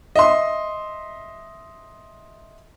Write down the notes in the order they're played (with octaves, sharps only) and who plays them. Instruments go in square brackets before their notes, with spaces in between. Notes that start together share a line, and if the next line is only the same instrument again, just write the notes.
[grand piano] D#5 E5 C6